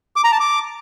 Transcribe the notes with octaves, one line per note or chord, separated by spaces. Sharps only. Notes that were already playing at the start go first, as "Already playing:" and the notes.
D6
A#5
A5
D6